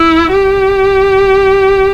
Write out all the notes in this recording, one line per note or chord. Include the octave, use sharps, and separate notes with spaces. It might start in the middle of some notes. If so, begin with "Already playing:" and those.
Already playing: E4
G4